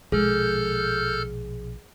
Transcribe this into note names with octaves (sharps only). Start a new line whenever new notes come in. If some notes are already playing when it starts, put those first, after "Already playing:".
A#1 B2 F3 G#3 G#4 A4 F6 G6